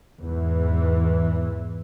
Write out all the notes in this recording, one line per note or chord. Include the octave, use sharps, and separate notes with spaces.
E2 G#2 E3